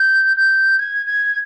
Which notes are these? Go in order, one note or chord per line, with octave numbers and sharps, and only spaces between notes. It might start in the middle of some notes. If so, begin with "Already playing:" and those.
Already playing: G6
G6
G#6
G#6